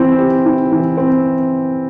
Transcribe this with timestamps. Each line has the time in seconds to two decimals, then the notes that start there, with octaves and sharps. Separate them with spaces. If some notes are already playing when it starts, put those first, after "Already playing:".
Already playing: E3 C4 E4
0.18 G4
0.45 E4
0.72 E3
0.97 C4